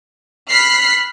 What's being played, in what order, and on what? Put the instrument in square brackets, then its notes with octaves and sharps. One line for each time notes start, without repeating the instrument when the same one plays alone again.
[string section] B5 F6 F#6 B6 C7